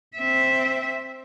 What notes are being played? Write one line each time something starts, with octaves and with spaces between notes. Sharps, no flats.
C4 E5